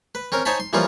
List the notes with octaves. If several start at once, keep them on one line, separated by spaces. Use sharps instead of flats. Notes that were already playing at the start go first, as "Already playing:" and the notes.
B4
C4 C#4 A#4
D#4 C5 C#5 G#5 A5 B5
C6
E3 F3 G3 A#3 C#4 F4